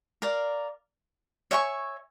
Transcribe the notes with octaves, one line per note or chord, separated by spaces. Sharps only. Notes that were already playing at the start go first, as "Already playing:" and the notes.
A#4 D5 F5
C#5 E5 G#5 C#6